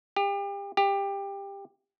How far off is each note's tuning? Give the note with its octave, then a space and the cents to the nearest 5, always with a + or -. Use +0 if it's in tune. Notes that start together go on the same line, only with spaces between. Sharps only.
G4 +35
G4 +20